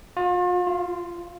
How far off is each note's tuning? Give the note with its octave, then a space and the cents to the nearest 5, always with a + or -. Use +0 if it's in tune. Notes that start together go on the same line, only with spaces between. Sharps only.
F4 +40
F4 -15